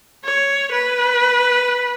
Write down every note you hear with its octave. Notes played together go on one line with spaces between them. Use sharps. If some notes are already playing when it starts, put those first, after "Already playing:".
C#5
B4